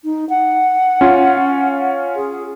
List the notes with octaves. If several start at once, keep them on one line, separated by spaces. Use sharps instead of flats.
D#4
F#5
C#4 F4
G#4